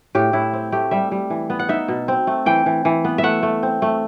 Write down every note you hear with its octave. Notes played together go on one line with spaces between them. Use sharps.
A2 G4
A2 E4
C4
A3 G4
G3 E5
G3
E3
B3
F#5
D#4 E5
B2
C4
A3
E3 G5
E3
E3
B3
E5
A3 F#5
A3
C4
A3